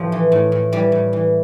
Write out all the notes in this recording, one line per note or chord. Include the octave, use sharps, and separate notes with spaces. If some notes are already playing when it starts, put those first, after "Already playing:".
Already playing: A2 F3 G4 A4
E3
A2
A2
E3 G3
A2
E3